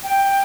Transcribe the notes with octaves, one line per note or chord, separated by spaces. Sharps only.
G5